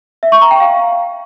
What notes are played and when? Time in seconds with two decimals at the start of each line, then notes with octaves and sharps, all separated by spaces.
0.23 E5
0.32 C#6
0.41 A#5
0.51 G5
0.60 F5